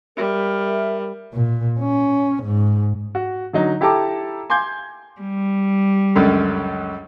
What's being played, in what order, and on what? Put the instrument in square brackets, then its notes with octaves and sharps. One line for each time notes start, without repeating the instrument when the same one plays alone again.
[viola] G3 [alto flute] A#4 [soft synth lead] E5
[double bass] A#2
C#4
G#2
[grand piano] F#4
D3 F#3 D#4
E4 G4 A4 A5 A#5 D6
G#5 C6 D6 G6 G#6
[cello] G3
[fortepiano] C#2 F#2 D3